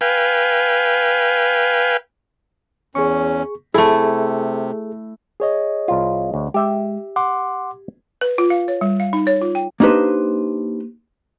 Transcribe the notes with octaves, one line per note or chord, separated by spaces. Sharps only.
B4 F5 G5 G#5
E2 C#4 G#4 C#6
C3 A3 E4 G#4 A4
G#4 C#5 D#5
C2 F4
D2
G#3 G4 E5 G5
F#5 C6 D6
B4
F4
F5
C#5
G3
F5
D#4
C#5
F4
G5
A#3 D4 D#4 G4 B4 C5